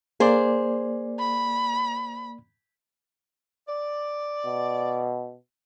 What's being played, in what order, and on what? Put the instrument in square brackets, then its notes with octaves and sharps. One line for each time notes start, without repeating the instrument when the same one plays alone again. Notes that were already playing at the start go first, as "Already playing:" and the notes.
[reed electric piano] A#3 D5 [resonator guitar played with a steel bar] G#4 C5
[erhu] B5
[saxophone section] D5
[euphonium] B2